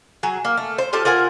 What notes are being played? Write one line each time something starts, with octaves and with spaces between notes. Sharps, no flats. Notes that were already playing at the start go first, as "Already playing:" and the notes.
F#3 G#4
A#3
A3
C5
F4 G4 A4 A5
F4 A#4 F#5 G#5